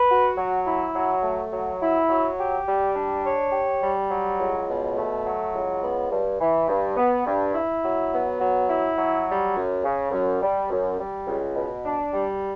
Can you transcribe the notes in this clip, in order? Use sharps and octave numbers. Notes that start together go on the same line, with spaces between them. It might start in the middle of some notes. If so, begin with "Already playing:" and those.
Already playing: B4
F#4
F#3
E4
F#3
A3
F#3
E4
F#3
G4
G3
D4
C#5
G4
G3
F#3
C#2
B2
A3
F#3
C#2
B3
G2
E3
G2
B3
G2
E4
F#3
B3
F#3
E4
F#3
G3
F#2
C#3
F#2
G3
F#2
G3
C#2
B2
D4
G3